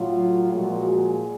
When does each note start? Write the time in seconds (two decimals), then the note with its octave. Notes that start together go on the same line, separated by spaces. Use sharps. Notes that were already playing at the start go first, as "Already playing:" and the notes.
Already playing: A2 F#3 F4
0.52 A#2 F3 G#3 F#4
0.87 G#4